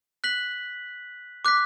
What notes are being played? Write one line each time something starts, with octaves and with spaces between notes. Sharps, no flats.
F#6 B6 F#7
D6 F#6 B6